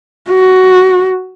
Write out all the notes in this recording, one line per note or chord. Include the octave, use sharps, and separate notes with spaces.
F#4